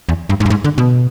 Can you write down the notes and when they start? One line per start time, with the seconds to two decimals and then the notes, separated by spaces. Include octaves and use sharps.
0.09 E2
0.29 G2
0.40 G#2
0.46 G2
0.50 G#2
0.64 D3
0.78 B2